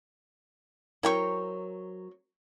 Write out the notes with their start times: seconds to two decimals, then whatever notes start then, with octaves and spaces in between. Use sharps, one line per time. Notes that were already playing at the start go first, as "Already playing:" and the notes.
1.03 F#3 C4 E4 A#4 G5 C#6